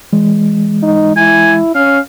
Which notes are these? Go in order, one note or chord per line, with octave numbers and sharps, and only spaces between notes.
E3 G#3
D#4
E4 G#5
C#4 F5